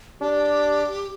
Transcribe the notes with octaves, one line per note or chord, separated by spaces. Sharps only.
D4 G4